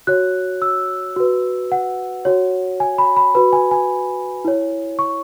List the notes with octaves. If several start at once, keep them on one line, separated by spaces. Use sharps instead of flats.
F#4 C#5 F#6
E6
F#4 B4
F#5
F#4 C#5
G#5
B5
B5
F#4 B4 B5
G#5
G#5
E4 C#5
C#6